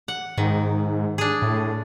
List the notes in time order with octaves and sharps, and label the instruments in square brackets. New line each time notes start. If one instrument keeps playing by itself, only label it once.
[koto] F#5
[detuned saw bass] G#2 [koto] D#3
[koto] D4 G#4
[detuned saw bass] A2